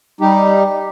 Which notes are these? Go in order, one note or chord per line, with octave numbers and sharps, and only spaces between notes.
G3 D#4 G4